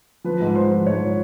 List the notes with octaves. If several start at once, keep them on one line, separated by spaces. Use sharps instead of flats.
F3 B4
G#2
F3 C5
F3
G#2 C#5
F3